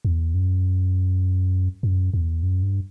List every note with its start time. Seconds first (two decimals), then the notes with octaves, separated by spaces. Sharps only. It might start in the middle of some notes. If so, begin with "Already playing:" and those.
0.05 E2
0.34 F#2
1.83 F#2
2.14 E2
2.43 F#2
2.62 G2